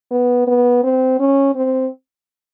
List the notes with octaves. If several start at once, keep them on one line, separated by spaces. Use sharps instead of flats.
B3
B3
C4
C#4
C4